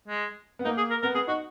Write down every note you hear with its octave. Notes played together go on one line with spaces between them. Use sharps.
G#3
B3
A#3 D#4
G#4
A#4
B3 A#4
B3 G#4
D#4 F#4